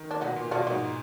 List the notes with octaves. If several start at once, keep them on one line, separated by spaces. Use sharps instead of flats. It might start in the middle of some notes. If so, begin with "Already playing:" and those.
Already playing: D#3
D4
B2 B3 D#4
A#2
B2 D4 F4
A#2
G#2 D#4 F#4